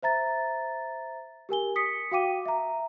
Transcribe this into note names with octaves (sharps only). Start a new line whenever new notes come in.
C5 E5 A#5 A6
G4 A#4 G#5 G7
D#6 B6 C#7
F#4 F5 G5 D6 D#7
E5 A#5